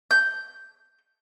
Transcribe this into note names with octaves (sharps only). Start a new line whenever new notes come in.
G6